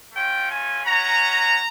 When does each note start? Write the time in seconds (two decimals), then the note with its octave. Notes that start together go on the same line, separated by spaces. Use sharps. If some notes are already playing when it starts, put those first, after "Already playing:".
0.13 A3 C#4 F4 G5
0.50 G#5
0.86 G#3 C#4 F#4 A#5